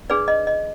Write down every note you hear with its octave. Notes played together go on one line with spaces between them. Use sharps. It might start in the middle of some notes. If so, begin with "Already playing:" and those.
D4 G#4 B4 D5
D#5
D#5